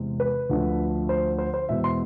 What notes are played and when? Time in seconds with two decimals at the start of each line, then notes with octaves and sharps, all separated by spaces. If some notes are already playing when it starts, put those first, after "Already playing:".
Already playing: E2 C3 G#3 C4
0.20 B4
0.50 D2 D3 F3 A3 D4
1.09 C5
1.39 C5
1.54 C5
1.69 E2 B2 G#3 E5
1.84 C6